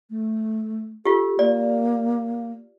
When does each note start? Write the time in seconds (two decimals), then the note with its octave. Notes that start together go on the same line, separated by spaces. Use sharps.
0.10 A3
1.05 F4 G4 A4
1.39 A#3 D5